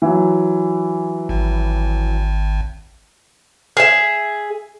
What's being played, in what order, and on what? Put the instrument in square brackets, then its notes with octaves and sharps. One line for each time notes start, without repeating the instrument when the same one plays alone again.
[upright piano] E3 F#3
[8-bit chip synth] G#1
[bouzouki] G#4 E5